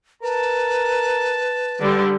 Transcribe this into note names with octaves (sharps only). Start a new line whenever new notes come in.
A#4 B4 A5
D3 G3 G4